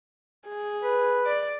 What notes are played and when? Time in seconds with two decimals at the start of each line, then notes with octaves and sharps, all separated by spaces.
0.49 G#4
0.83 B4
1.26 D5